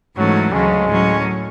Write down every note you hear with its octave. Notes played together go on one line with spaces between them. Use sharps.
G#2 E3 F#3 A3 C#4
D2 C#3 F#3 G#3 C#4
A2 F#3 C#4